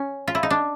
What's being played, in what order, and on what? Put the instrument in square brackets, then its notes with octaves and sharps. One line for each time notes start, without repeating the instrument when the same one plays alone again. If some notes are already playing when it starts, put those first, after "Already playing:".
Already playing: [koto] C#4
F4
E4
D#4
D4